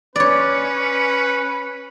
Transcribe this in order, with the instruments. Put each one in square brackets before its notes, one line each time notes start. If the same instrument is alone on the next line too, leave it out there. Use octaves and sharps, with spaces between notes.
[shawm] C#4 [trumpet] B4 [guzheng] C#5 D5